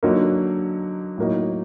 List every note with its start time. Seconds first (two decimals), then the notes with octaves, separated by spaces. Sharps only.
0.03 D3 F#3 A#3 D#4
1.17 A2 F#3 A#3 D#4